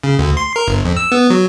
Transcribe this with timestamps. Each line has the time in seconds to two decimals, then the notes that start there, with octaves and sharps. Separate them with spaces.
0.03 C#3
0.19 D2
0.37 C6
0.56 A#4
0.67 G1
0.85 F2
0.97 E6
1.12 B3
1.30 F#3